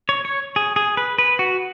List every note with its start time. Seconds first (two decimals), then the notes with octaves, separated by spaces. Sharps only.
0.09 C#5
0.25 C#5
0.56 G#4
0.76 G#4
0.97 B4
1.18 B4
1.39 F#4